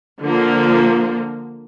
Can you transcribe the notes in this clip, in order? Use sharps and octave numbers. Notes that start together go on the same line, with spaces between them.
D3 F3 A#3